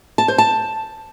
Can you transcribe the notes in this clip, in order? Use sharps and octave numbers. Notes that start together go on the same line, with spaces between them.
A5
C5
A5